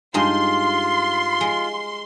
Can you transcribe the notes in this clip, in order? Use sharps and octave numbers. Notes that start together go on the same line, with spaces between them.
G2 G#3 D#4 F4 C6
G#3